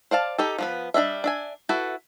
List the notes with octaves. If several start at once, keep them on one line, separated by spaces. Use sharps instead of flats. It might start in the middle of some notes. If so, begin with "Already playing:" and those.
C5 D5 F5 A5
D#4 G4 A4
F3 B3 B4
G3 D4 D#5 E5
D4 E5 G#5
E4 F#4 A4 B4 E5